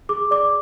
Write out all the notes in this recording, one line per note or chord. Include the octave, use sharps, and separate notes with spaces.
G#4 D6
D5 D6